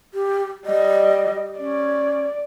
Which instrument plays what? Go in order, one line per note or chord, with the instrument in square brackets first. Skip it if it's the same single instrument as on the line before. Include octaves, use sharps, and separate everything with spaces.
[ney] G4
[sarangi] G3 [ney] D#5
[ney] C#4 [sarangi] D5